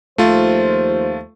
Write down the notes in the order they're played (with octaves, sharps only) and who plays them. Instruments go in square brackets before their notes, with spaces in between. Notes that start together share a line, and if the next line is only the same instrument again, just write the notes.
[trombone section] D#2 F3 C5 [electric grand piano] A3 F4